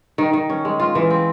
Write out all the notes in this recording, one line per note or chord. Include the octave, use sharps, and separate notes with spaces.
D#3
D#3
C#4
G#3
F4
E3
C4